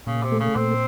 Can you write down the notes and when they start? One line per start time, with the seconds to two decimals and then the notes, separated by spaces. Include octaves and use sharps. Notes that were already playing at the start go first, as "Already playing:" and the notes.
0.07 A#2 C#3
0.23 C3
0.32 A3
0.40 C#3
0.55 A#2 C4